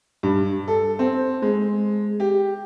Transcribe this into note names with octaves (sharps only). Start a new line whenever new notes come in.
G2
A4
C4
G#3
G4